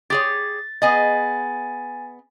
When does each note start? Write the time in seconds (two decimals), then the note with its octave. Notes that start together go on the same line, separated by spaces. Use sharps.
0.10 G4 G#4 C#5 A6
0.82 B3 G#4 D#5 G#5 A6